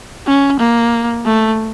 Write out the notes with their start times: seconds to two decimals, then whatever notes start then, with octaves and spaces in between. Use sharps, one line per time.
0.27 C#4
0.60 A#3
1.26 A3